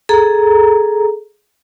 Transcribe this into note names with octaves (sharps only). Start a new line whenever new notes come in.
G#4 A4 A#5